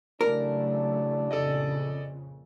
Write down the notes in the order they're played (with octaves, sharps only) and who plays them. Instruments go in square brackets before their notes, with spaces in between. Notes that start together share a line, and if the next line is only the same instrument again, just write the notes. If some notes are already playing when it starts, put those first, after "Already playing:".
[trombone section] A1 D4 [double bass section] C#3 F#3 A3 [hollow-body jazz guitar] A#4
[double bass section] F2 A#2 C#3 [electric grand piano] A4 D5 D#5